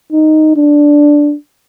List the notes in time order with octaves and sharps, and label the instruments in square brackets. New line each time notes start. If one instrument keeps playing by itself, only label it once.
[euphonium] D#4
D4